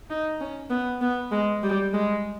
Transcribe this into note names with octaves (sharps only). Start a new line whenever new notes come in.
D#4
C#4
B3
B3
G#3
G3
G#3